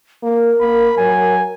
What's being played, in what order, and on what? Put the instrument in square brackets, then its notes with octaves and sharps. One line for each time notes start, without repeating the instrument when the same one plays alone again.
[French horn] A#3 [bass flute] A#4
[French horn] A#3 [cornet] B5
[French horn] F#3 [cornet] G#5